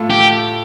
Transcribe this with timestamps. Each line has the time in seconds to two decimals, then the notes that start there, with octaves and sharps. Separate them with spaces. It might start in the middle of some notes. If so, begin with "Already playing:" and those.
Already playing: A2 A3 F4
0.10 G4